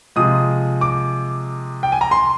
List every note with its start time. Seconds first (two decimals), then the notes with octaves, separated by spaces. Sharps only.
0.16 C3 F3 G#3 D#6
0.81 D6
1.83 G5
1.92 G#5
2.01 A#5
2.11 C6